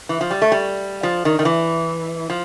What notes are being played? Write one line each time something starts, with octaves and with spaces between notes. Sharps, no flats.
E3
F3
G3
A3
G3
F3
D#3
D#3
E3
F3